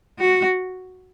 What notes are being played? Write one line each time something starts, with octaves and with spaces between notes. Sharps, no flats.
F#4